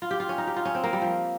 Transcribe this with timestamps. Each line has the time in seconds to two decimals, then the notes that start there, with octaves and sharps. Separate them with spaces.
0.02 F4
0.11 G4
0.20 F4
0.29 C#4
0.38 D#4
0.47 G4
0.56 F4
0.65 C#4
0.75 C4
0.84 A#3
0.93 G3
1.02 F3